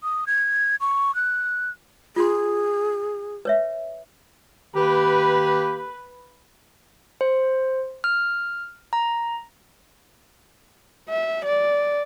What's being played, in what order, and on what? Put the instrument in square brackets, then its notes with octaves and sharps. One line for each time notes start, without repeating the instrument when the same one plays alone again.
[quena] D#6
G#6
C#6
F#6
[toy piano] F4 C6 [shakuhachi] G#4
[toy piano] B4 C#5 E5
[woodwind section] D#3 A#3 G4 [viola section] B4
[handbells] C5
F6
A#5
[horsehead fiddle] E5
D5